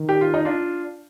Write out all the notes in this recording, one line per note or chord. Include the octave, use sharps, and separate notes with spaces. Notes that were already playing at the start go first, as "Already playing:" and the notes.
Already playing: D#3
G4
F4
D#4
D4 F4